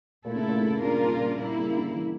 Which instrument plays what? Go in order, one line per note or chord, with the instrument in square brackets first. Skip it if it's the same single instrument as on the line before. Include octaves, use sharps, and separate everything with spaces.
[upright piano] A#2 [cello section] A3 E4 A4
[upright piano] C#3
A#2
C#3
A#2
[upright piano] C#3 [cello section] G3 A#3 D4 F4 A#4
[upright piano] A#2
C#3
A#2
[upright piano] A#2 [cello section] G3 A#3 E4
[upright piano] C#3
D3
E3